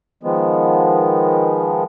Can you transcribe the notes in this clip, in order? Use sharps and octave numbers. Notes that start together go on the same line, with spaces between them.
D#3 F3 G#3 B3